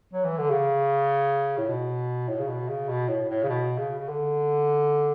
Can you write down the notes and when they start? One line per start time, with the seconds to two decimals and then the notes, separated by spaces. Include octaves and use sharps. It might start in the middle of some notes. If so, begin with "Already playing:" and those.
0.13 F#3
0.25 E3
0.38 D3
0.51 C#3
1.58 A2
1.69 B2
2.29 A2
2.39 C#3
2.48 B2
2.69 C#3
2.89 B2
3.09 A2
3.29 A2
3.43 C#3
3.49 B2
3.78 C#3
3.98 C#3
4.09 D3